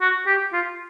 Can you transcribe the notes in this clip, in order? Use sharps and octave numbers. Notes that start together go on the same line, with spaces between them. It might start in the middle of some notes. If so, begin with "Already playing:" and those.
F#4
G4
F4